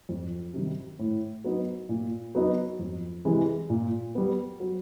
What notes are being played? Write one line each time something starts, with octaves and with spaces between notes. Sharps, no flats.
F2
C3 D#3 G3
A2
F#3 B3 D#4
A#2
F#3 B3 D#4 F#4
F2
C3 E3 G#3
A#2
G3 B3
F#3